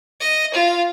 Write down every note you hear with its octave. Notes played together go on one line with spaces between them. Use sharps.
D#5
F4